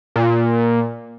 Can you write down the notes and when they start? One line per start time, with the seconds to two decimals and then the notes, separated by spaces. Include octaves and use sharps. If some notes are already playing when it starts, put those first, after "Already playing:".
0.16 A#2